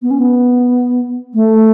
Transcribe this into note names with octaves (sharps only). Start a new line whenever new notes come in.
B3
C#4
B3
A3